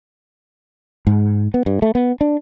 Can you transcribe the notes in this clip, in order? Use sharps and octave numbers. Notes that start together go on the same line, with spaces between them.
G#2
B3
G2
A3
B3
D4